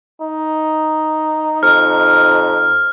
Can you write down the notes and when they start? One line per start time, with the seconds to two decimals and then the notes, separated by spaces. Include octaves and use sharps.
0.22 D#4
1.63 F2 F6